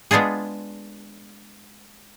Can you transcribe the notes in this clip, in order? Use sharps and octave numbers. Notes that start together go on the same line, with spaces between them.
G#3 B3 D4 F4 G#4